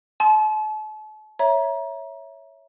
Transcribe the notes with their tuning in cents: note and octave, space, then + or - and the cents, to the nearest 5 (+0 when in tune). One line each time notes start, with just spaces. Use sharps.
A5 -40 C6 +0
C#5 +0 E5 +0 A#5 +30